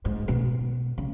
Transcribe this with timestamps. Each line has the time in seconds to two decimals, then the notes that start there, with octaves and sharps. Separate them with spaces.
0.05 G#2
0.28 B2
0.98 C#3